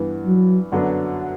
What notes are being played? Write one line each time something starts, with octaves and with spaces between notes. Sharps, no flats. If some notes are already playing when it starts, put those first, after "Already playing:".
Already playing: G2 E3 B3
F#3
F#2 D3 F#3 B3 D4